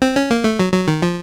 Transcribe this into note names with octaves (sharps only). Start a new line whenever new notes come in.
C4
C#4
A#3
A3
F#3
F#3
D#3
F3